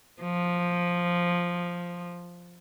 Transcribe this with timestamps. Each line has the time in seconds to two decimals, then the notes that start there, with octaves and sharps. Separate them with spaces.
0.22 F3